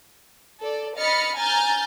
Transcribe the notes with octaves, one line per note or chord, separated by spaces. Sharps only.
A4 D5
D#5 B5 F6 A6 C#7
G#5 A#5 F6 G6 A6